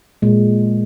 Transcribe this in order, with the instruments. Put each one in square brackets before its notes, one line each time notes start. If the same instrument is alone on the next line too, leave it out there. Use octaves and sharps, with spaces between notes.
[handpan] A#2 G#3